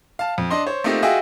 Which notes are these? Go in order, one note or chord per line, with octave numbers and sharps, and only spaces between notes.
F5 A5
F2
D4 D#5 C6
C5 C#5
A3 A#3 C4 D#4 F4 G4
F4 F#4 G#4 D#5 E5 G5